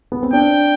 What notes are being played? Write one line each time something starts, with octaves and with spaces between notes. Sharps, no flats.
B3
C4
D4 G5